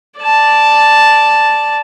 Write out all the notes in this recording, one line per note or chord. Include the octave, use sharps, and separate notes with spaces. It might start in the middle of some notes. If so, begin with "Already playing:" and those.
D5 A5